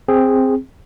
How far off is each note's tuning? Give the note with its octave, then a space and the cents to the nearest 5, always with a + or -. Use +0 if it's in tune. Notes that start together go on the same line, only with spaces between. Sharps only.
C4 +0 G#4 -10